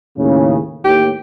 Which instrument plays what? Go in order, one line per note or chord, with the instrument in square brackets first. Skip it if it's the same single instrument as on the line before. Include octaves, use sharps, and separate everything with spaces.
[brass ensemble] D#2 A2 C#3
[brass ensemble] D#2 A2 [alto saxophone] G4